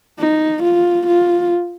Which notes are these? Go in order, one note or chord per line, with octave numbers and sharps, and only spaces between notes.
D#4
F4
F4